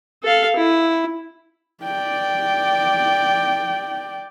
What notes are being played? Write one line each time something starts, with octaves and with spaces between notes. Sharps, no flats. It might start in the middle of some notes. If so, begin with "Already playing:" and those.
A4 F5
E4
D5 G5